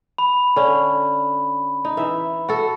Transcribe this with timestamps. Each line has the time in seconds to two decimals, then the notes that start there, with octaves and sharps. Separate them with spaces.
0.18 B5
0.56 D3 C#4
1.85 D#4
1.97 E3 E5
2.49 F#4 A4